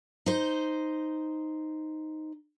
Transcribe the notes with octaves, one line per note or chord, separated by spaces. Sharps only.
D#4 C5